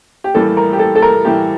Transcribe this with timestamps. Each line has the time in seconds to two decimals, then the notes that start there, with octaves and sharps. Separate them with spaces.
0.24 G4
0.34 A2 E3 G3 A#3 A4
0.57 A#4
0.73 G4
0.79 A4
0.95 A4
1.02 A#4
1.25 A2 E3 G3 A#3 G4